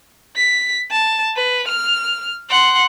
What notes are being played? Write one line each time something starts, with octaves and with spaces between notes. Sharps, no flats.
B6
A5
B4
F6
F#5 C6